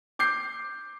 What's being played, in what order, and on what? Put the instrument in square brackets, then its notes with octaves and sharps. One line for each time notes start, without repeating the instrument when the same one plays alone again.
[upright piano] D6 G6 C7